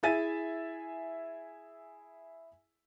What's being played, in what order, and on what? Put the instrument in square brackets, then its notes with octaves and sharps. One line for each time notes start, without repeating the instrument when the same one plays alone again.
[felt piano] E4 G#4 E5 G#5 A6 D#7